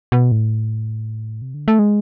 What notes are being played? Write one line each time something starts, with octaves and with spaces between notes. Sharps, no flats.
B2
A2
C3
D3
A3
G#3